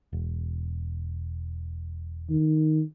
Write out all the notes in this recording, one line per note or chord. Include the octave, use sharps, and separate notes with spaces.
E1
D#3